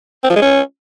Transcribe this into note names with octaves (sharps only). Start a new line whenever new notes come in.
C4
F3
G#3
C#4